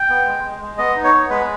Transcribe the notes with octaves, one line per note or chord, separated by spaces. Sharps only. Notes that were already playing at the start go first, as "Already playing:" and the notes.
Already playing: G5
B3
G#3
G#3
G#3
B3 D#5
D#4
C#5
B3
G#3 B4